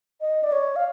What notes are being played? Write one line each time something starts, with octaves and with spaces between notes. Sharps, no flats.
D#5
D5
C#5
F5